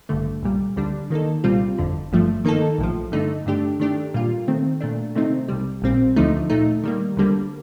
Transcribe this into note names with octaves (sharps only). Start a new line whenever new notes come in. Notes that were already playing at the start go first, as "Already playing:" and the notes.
A1 G2 D3 A3
C2 A#2 G3
D2 D3 G3 D4
D#3 A#3 D#4 A4
C2 A#2 G3 C4 F4
G1 F2 D3
G1 G2 F3 A3
D#3 A#3 D#4 A4
A#1 A2 F3
G2 D3 A3 D#4
G2 D3 A3 D4 G4
D#3 A3 D4 G4
A#2 G3 A#3 F4
D#3 A3 C4
A#2 A3 D4
C3 D#3 A3 C4 D#4
C2 C3 G3
A#1 A#2 G3 C4
D2 D3 F3 A3 D#4
A#2 A3 D#4
D#3 G3 A#3
D2 D3 G3 A#3